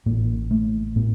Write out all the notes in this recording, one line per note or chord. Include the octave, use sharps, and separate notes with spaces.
A1 A2 A#3
A3
A2 B3